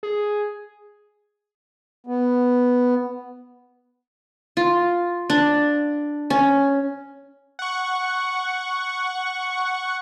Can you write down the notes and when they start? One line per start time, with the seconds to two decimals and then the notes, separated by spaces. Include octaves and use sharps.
0.03 G#4
2.07 B3
4.57 F4
5.30 D4
6.30 C#4
7.59 F#5 C#6